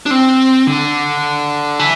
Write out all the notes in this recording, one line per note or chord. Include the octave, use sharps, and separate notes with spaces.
D4
C4
D3
E3